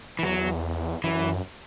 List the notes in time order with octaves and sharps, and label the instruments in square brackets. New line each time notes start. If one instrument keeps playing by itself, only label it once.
[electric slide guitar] E3
[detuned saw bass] E2 [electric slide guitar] F#3
[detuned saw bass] F#2 [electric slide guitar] E3